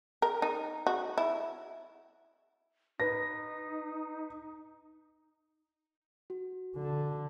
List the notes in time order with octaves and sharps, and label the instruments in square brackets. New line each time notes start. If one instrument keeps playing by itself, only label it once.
[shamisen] A#4
D#4
F#4
E4
[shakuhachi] D#4 [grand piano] B4 A#6
[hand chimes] F#4
[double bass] D3